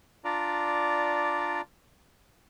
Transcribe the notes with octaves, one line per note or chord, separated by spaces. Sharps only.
D4 F4 D5 A#5